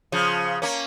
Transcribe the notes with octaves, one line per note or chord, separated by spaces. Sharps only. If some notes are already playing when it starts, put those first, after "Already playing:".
C#3 F3
A#3 C#4